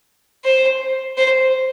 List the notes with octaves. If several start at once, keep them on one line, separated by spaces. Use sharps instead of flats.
C5
C5